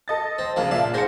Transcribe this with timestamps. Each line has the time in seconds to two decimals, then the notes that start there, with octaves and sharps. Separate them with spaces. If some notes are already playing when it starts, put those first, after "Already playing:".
0.08 A4 D#5 A6
0.38 C4
0.56 C#3 F3 A#3 D4
0.71 A#2 D5 E5 F5 A5
0.94 G#2 C5 G#5 A#6 C#7